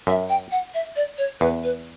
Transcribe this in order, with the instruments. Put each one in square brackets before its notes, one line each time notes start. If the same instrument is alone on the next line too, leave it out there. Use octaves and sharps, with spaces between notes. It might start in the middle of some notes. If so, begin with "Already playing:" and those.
[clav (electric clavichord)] F#2 [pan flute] E5
[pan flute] G5
F#5
E5
D5
C#5
[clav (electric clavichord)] E2 [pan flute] B4
[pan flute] B4